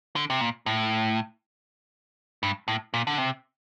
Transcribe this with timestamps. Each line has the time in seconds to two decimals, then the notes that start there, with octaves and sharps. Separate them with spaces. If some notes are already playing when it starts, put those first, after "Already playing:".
0.16 D3
0.30 C3
0.41 A#2
0.66 A2
2.43 G2
2.68 A2
2.94 A#2
3.07 D3
3.18 C3